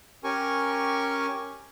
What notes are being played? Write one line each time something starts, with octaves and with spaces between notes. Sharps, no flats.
C#4 G4 A#4 G#5 C#6